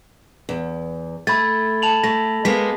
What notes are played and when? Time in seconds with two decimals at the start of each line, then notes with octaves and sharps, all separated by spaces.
0.49 E2
1.27 A3 B5 G#6 A6
1.82 A5 F7 F#7
2.04 A3 A#6
2.45 G#3 A#3 B3 B6